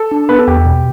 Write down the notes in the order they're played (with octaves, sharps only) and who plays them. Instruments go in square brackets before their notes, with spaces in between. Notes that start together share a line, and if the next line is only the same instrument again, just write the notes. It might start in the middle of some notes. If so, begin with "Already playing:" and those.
Already playing: [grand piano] A4
[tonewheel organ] D4
[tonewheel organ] B3 [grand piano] B4
[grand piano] A4
[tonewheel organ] E2 [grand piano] G4
[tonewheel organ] B2